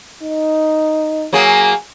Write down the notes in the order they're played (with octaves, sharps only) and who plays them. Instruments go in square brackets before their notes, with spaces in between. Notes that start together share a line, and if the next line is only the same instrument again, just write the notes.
[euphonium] D#4
[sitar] F#3 A#3 G#4